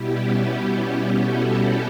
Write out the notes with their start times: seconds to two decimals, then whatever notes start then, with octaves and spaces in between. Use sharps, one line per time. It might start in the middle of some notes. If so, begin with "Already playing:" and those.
Already playing: B2 G3 B3 E4 G4
0.18 C#4 E4
0.47 C#4 E4
0.76 E4 G4
1.19 F#4 A4